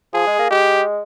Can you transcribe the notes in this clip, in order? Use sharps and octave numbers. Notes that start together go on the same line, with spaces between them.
F3 G#4
G#3
A#3
G#3 G4